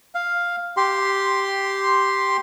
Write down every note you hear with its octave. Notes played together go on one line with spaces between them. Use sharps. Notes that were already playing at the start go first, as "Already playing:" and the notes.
F5
G4 C6